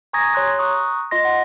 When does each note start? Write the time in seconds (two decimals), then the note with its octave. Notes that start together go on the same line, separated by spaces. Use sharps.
0.13 G#5 A#5 C#6 D#6 G#6 A#6
0.35 G4 C#5 C6 F#6
0.59 A#5 C#6 D#6 F#6
1.11 F4 D#5 C6 A#6
1.25 F#5